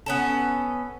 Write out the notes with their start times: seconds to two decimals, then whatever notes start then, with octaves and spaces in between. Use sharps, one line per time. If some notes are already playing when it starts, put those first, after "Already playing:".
0.06 B3 C#4 A4